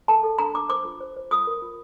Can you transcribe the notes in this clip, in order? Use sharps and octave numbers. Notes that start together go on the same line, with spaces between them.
A4 A5
A4
D4 A#5
D4 D6
C5 D6
F4
C5
C5
F4 D#6
A#4
F4